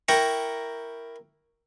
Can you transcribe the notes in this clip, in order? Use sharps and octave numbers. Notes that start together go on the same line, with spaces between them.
E4 A#4 G5 A#5 C#6